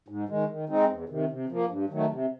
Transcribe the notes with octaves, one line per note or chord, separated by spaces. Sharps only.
G#2
D#3 G#3
D#3
G#3 C4 D#4
E2
C3 D#3
C3
F3 A#3
G2
D#3 F#3 A3
C3